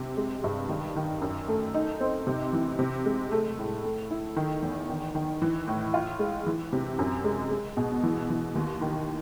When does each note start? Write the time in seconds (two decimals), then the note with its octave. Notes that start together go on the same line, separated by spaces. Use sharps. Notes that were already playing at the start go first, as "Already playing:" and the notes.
Already playing: C3
0.17 G#3
0.44 G2
0.69 D#3
0.96 D#3
1.21 F#2
1.48 A3
1.74 D#4
2.00 C4
2.27 C3
2.53 E3
2.79 C3
3.05 G#3
3.32 A3
3.58 A2
3.84 A3
4.10 E4
4.36 D#3
4.62 E2
4.89 D#3
5.15 D#3
5.42 E3
5.68 A2
5.94 F4
6.19 G#3
6.46 E3
6.73 C3
6.99 F#2
7.24 G#3
7.50 G#3
7.77 B2
8.03 E3
8.30 E3
8.55 D#2
8.81 D#3